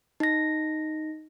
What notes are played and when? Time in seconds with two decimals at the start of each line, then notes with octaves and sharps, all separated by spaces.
0.20 D#4 A#6